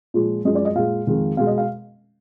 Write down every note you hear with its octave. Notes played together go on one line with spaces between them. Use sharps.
A#2 F3 G#3
F#2 F3 G#3 D#5
D5
D#5
A#2 G#3 F5
F2 D#3 G#3
B2 G#3 F5
D#5
F5